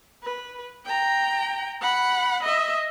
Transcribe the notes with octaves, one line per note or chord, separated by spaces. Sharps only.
B4
G5 A#5
F#5 B5
D#5 E5